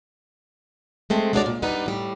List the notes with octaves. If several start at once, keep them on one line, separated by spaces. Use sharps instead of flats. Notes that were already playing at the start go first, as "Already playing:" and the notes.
G#3 A3 C4
G#3 D4 F#4 G#4 C#5 D5
A#2
G3 B3 D4 D#4 B4
A2 G3